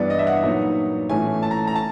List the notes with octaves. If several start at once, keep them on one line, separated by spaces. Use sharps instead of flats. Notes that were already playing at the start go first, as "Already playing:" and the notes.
Already playing: G2 E3 G3 B3 D4 D5
D#5
E5
F#5
A#2 F#3 B3 D#4
A2 E3 A3 C#4 G#5
A5
A#5
A#5
A5